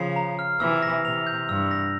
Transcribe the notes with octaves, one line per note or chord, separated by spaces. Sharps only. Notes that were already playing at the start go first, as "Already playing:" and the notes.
Already playing: C#3 F3 C7
A#5
F6
C3 E3 E6
A#6
C3 F7
G6
G2 E6
A#6